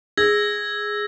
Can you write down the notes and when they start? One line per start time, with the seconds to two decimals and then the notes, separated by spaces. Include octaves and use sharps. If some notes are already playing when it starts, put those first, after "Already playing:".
0.17 G#4 E6 G#6 A#6